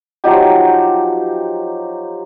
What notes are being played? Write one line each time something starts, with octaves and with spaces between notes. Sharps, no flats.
F3 F#3 D#4 G4